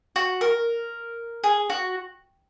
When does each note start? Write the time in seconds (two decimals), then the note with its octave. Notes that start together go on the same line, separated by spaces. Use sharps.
0.16 F#4
0.41 A#4
1.44 G#4
1.70 F#4